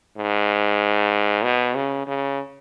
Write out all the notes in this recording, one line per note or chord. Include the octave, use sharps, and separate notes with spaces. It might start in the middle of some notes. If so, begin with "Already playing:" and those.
G#2
B2
C#3
C#3